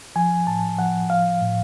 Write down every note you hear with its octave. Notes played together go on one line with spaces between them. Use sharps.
F3 G#5
A2 A5
F3 F#5
F3 F5
A2